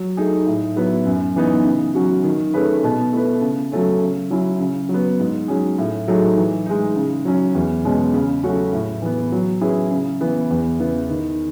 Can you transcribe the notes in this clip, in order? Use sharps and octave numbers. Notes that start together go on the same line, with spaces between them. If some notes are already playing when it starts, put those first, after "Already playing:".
Already playing: F#3
A3 D#4 G#4
A2
F#3 B3 E4 B4
F#2
E3 B3 D#4
C#3
F#3 C#4 F#4
D#3
A3 C#4 G#4 B4
B2
A3 E4 B4
C#3
F#3 A3 C#4
C#3
F#3 C#4 E4
C#3
F#3
B3
G#2
F#3 C#4 G#4
A2
F#3 A3 D#4 G#4
E3
G#3 D#4
C#3
F#3 C#4
E2
B2 G#3 C#4
C#3
F#3 A3 C#4 F#4
A2
E3 B3
F#3
C#4 E4 G#4 B4
C#3
E3 B3
E2
C#3 E3 B3
D#3